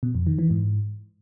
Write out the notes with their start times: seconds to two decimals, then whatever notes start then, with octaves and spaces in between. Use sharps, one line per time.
0.03 B2
0.15 F2
0.27 D#3
0.39 E3
0.50 G#2